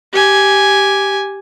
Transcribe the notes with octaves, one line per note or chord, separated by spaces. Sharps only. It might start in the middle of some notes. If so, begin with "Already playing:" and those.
G4 G#5